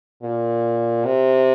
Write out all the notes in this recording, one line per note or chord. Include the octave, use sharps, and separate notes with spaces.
A#2
C3